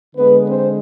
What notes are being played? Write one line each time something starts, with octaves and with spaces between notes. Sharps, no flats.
D3 G#3 B3 B4
C4 C5